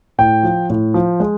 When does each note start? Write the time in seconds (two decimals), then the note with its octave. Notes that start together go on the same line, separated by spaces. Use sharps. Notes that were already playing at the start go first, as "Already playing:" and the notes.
0.18 A2 G5
0.43 F3
0.70 A2
0.94 F3
1.20 G#3